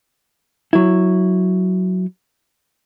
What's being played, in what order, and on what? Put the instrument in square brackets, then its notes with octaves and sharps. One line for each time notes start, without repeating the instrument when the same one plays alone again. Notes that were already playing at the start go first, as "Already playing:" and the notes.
[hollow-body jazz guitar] F#3 E4